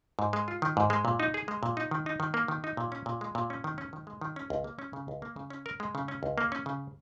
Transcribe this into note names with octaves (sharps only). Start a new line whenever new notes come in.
G#2
G#3
F4
D#3
G#2
G#3
A#2
D#4
G#4
G#3
A#2
D#4
D#3
D#4
D#3
A#3
D#3
D#4
A#2
C#4
A#2
G#3
A#2
C#4
D#3
C#4
D#3
G#3
D#3
C#4
C#2
A#3
C#4
C#3
C#2
A#3
C#3
C#4
A#4
G#3
C#3
C#4
C#2
A#3
C#4
C#3